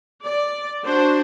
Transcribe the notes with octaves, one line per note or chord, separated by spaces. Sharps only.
D5
D4 F#4 C5